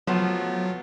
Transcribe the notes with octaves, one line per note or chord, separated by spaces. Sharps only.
F3 F#3 A3 B3